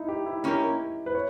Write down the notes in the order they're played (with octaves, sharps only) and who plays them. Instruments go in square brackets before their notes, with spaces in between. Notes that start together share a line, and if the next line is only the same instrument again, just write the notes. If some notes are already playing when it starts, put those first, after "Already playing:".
Already playing: [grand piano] D#4 E4
G4
E4
[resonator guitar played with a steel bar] A#3 C#4 G4 A#4 [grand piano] E4
[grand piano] B4
C#5